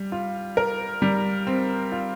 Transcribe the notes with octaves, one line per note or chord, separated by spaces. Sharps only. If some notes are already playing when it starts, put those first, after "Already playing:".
Already playing: G3
F4
A#4
G3
C4
F4